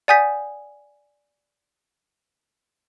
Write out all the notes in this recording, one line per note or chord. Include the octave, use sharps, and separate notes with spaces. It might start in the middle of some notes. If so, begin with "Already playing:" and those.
D5 F#5 G#5 D#6 G6 B6